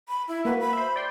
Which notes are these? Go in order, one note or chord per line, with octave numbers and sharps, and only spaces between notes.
B5
E4
A#3 F#4 B4
B5
C5 E5
D5 G5 C6